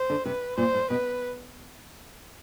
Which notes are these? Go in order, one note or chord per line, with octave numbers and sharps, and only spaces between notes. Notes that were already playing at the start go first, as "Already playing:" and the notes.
Already playing: C5
D3
C3 B4
A#2 C5
A2
B2 B4